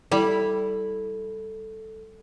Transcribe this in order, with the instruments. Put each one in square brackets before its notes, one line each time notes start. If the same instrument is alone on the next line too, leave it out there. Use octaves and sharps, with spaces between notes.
[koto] G3 [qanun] E4 B5 [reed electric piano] A4